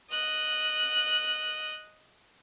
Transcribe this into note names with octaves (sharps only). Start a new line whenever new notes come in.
D#5 F#6